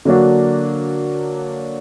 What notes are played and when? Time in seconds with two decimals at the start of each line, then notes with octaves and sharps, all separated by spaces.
0.05 D3 F#3 A#3 D4 F#4